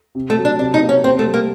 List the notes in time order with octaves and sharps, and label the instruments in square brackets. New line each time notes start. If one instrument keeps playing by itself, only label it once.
[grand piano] C3
[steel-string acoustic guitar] A3
[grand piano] F#3
[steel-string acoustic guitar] D4
[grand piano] C3 [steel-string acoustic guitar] D4
[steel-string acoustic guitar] D#4
[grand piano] A#3
[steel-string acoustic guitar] C#4
[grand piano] C3 [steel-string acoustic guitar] C4
[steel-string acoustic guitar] A3
[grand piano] G3
[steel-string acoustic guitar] A#3